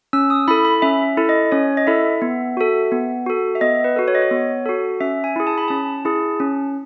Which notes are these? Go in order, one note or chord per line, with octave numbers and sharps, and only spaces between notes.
C#4 E6
D#6
E4 A4 B5
B5
C#4 E5
E4 A4
D#5
C#4 C#5
D#5
E4 A4 E5
B3
F#4 A4
B3
F#4 A4
E5
B3 D#5
B4
F#4 A4
C#5
D#5
C#5
B3
F#4 A4
C#4 E5
G#5
E4 G#4
A5
B5
C#4 A5
E4 G#4
C#4